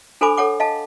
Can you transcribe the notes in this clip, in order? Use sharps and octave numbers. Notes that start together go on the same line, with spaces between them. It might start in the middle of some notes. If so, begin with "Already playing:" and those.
D4 A4 C5 G#5 B5 D6
A4 C#5 F#5 D6
D#5 F5 A5